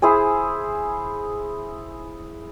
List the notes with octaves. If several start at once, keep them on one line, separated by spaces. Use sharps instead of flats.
E4 G#4 C5 G#5